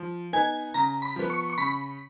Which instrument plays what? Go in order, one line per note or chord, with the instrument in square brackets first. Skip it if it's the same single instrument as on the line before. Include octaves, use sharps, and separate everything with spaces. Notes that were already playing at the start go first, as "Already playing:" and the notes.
Already playing: [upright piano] F3
[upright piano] B3 D#4 [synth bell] G#5
[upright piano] C#3 [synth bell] A#5
[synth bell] B5
[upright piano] F3 B3
[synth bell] C#6
C#6
[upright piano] C#3 [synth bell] B5